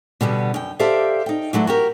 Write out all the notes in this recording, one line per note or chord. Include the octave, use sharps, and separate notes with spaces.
B2 D3 G3 B3
F#2 G5
G4 A4 C5 D5 E5 F5
D#4 G5
E3 F#3 A3 D4
F#4 G4 A#4